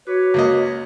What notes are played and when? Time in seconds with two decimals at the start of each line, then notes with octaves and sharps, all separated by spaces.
0.07 F#4 B4 C#5 D6
0.34 C#2 A#3 D#5